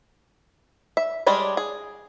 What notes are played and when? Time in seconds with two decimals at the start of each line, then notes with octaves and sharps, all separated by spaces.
0.97 E5
1.27 G3 G#3 D4 C#5
1.57 G#4